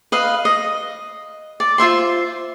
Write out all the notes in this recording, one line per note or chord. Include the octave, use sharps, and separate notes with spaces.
B4 D#5 F5
D#5
D5
F4 C5 E5 C6